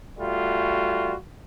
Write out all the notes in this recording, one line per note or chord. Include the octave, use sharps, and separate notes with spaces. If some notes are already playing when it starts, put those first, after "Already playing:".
G3 A3 F4 F#4